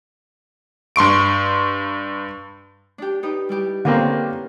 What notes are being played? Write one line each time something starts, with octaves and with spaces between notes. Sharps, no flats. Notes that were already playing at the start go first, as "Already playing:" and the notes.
G2 C6 C#6 D7
D4 G4
D#4 G4 B4
G3 E4 G4
D3 A#3 C4 C#4 A#4 B4